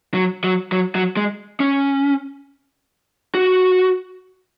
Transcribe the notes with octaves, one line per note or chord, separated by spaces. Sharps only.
F#3
F#3
F#3
F#3
G#3
C#4
F#4